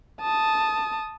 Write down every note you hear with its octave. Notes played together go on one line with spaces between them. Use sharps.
A5 D#6